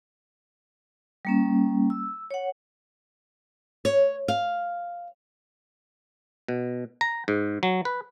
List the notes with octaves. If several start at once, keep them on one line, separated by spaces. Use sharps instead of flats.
G3 A#3 C#4
E6
C#5 F#5
C#5
F5
B2
A#5
G#2
F#3
B4